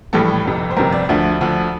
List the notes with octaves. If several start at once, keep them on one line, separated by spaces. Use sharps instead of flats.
A#1 A2 E3 G3 A4
G1 F2 C3
C5
G1 F2 C3 A#4
D5
D2 D3 F3 E5
D2 D3 F3